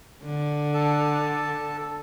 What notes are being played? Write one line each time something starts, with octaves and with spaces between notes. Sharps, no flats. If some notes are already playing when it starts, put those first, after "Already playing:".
D3
A4 A5